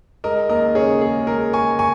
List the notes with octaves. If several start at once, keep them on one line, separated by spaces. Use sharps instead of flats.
G#3 A#4 D#5
D#2 A#4 D#5
C#3 G#4 C#5
D#2 G#4
G#3 A#4
G#3 G#5 C#6
G#5 C#6